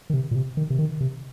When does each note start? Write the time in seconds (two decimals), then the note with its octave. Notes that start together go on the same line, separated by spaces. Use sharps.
0.10 D#3
0.14 C3
0.31 A#2
0.35 C3
0.57 D#3
0.70 C3
0.79 D#3
1.01 C3